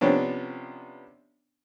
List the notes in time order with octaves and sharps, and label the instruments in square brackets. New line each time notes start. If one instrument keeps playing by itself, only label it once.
[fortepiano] C3 F3 B3 C#4 D4